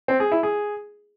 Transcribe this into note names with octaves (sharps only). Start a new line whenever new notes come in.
C4
G#4
E4
G#4